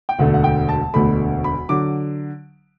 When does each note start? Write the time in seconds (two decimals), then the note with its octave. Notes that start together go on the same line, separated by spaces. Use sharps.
0.09 G5
0.19 E1 D2 D3 A3 F#5
0.34 F#5
0.44 G5
0.69 A5
0.94 E1 D2 D3 A3 B5
1.44 B5
1.69 D3 F#3 D6